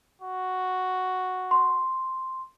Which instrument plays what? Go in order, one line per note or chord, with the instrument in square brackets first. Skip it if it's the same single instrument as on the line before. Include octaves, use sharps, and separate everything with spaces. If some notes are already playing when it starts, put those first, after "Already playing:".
[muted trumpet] F#4
[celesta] C6